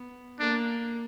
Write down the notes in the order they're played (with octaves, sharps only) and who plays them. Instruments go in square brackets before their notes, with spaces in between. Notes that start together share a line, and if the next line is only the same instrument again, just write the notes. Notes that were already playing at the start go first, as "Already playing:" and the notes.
Already playing: [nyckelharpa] B3
[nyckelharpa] A#3 [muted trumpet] D4